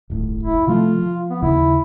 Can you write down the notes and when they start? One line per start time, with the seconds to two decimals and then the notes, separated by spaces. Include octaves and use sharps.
0.10 D1 G1 A2
0.43 E4
0.67 C3 F3 A3 F4
0.99 F3
1.30 B3
1.42 D#2 C#3 E4